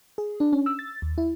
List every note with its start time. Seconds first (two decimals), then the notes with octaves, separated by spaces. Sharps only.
0.18 G#4
0.40 D4
0.52 C#4
0.66 E6
0.79 A6
1.02 D#2
1.18 E4